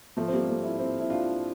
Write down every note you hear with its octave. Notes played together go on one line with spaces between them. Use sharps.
F3 A3
C4
G3 A#3
A3 C4
C4 E4
C4 E4
E4
D4 F4